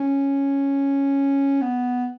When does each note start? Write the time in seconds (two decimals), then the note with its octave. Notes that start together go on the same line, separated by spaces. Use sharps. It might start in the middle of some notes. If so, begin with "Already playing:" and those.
Already playing: C#4
1.61 B3